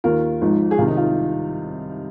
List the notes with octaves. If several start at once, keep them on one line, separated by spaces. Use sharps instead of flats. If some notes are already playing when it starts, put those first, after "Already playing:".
D#2 D#3 F4 A#4
G#1 G#2 F3
G#4
C2 C3 D#3 F4
D#4
F4